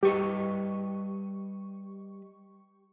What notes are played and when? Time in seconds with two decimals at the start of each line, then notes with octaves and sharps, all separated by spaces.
0.03 G3 G4 B4 D#5 C#6